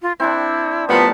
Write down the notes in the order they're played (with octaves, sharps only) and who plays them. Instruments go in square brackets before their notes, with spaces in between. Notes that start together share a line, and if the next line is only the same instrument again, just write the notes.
[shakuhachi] F4
[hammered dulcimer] C4 D4 [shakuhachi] E4
[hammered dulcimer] A2 G3 A#4 [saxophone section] F3 B3 [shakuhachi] A5